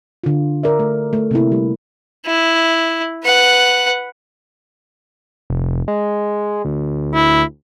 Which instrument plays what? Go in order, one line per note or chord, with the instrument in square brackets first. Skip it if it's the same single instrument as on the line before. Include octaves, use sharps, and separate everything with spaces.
[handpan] D3 F4
A#4 D5 E5
A3
A3
C3 A#3 E4
G3
[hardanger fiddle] E4
B4 F#5
[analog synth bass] F1
G#3
D2
[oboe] E4